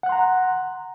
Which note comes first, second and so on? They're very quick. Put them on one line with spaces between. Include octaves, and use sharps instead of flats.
F#5 F#6 C6 A#5